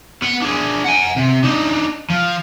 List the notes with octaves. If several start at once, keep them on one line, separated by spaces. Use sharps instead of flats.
B3 F#5
D4 G#4
F#5 G#5
C3
D4 D#4
F3